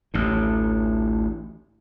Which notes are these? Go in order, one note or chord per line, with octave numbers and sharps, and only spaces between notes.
A1 D2 A2